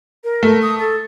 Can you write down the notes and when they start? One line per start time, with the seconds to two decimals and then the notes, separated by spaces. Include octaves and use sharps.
0.24 A#4
0.43 A3
0.62 D#6
0.79 A4